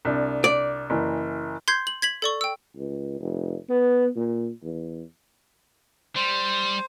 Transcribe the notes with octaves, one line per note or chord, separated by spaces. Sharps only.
C2 D4
D5
F#1 E3
C6 G6 G#6 C7
F#7
G#6 B6 F#7
A4 D5 C#6
G5 E6
C#2
F1
B3
A#2
E2
G3 C5